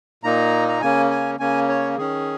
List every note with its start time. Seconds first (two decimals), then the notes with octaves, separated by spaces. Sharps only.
0.24 A#2 A#3 D#4 A#5
0.69 A#5
0.81 C#3 A#3 C#4 G#5
1.11 G#5
1.40 C#3 A#3 C#4 G#5
1.69 C#5
1.98 D#3 C#4 G#4